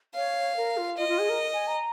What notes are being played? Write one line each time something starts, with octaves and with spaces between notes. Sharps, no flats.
C#5 F5
A#4
F4
F4 D#5
F4
G#4
A#4
G#5
A#5